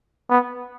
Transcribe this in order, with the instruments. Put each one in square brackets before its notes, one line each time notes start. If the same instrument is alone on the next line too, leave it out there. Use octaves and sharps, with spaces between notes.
[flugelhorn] B3